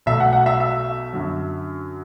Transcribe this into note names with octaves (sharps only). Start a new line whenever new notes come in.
B1 B2 A3 E5
F#5
F#5
E5
E5
F#2 D3 F#3